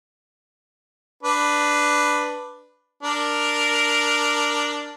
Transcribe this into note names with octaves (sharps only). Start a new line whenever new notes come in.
D4 B4
D4 A#4